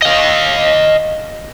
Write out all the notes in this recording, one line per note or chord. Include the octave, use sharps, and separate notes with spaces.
D#5 F5